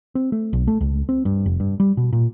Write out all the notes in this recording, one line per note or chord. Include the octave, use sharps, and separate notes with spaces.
C4
A3
B1
A3
C#2
C4
G2
F1
G2
G3
B2
A#2